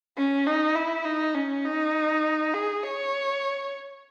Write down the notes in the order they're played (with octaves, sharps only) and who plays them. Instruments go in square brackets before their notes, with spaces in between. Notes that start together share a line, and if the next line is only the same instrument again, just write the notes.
[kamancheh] C#4
D#4
E4
D#4
C#4
D#4
G#4
C#5